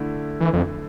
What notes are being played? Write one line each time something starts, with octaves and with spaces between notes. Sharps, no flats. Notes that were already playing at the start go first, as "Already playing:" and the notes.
Already playing: D3 A3 E4
E3
F2